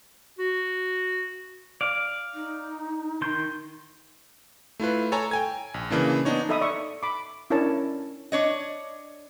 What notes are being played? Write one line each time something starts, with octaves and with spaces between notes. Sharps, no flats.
F#4
D5 F5
D#4
D#3 C6 G6
A3 E4 F4 B4
A4 C#5 G#5 A#5
G5 G#5 G#6
A#1
C#3 E3 A#3 D4
B3 D4 D#4 C#5
D#4 A4 D#5 E5 B5 D#6
D5 E5 C#6
B5 D6
C#4 D4 E4 A#4 C#5 A5
D4 C#5 D#5